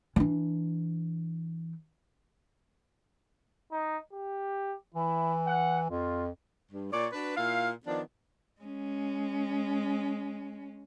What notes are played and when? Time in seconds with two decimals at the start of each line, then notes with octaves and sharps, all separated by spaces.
0.16 E3 D4
3.72 D#4
4.13 G4
4.94 E3 E4
5.47 F#5
5.90 F2 F4
6.72 G2
6.92 A#2 C#5 D5
7.13 D4 F#4 B4
7.36 A#2 E4 F5
7.86 D#3 F3 B3 D4
8.61 G#3 C#4